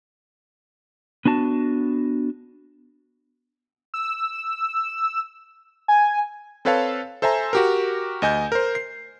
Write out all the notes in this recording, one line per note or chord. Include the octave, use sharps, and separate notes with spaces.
B3 D4 F#4 A5
E6
G#5
C4 A4 B4 C#5 F5 A5
A4 C5 E5 G#5 A#5
F#4 G4 A#4
D2 D#5 G#5 G6
A#4 C5
C7